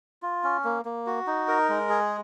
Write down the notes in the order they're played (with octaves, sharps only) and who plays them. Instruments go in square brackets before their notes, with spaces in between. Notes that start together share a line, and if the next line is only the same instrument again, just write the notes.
[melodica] F4
C#4
A#3
A#3
F#4
D#4
A#4
G#3
G#4